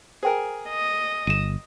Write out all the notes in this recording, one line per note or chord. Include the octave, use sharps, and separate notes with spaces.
G#4 A#4 C5 G5
D#5
G1 D#7 E7